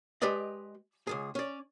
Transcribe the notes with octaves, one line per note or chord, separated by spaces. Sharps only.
G#3 G4 B4 D5 D#5
C#2 G#2 G#4
C#4 D5